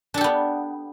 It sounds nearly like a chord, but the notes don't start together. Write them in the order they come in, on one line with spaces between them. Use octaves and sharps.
D4 A4 G4 B3